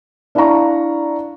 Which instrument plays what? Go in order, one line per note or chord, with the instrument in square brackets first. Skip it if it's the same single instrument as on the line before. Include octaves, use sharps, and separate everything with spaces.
[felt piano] D4 E4 D5 F5 A#5 C#6